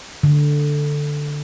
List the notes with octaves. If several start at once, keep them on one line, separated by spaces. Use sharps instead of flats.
D3